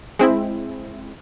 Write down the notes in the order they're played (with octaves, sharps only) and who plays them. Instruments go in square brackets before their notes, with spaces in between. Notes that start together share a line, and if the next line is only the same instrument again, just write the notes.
[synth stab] G#3 C4 E4